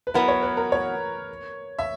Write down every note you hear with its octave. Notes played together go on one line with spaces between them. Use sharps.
B4
F#3 B3 E4 A#4
C#5
B4
A#4
C#5
E5